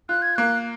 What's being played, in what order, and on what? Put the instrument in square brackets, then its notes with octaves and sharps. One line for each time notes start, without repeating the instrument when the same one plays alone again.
[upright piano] F4 [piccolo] F#6
[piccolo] G#6
[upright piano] A#3 [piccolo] F#6